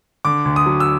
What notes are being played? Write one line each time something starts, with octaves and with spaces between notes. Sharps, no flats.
D3 D6
D2
D#6
F#3
E6